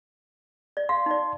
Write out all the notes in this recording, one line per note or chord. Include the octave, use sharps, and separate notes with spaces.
D5
F5 C6
D#4 D5